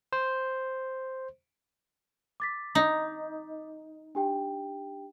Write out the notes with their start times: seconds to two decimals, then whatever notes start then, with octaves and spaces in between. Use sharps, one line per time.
0.13 C5
2.40 D6 A6 B6
2.75 D#4
4.15 D4 G4 G5